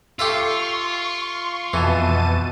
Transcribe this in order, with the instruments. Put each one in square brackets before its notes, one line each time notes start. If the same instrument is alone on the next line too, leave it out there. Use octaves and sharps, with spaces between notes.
[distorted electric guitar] F4 [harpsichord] G4 A4 E5 [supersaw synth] C6 C#6
[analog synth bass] F2 [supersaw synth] B2 A5 D#7 [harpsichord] E3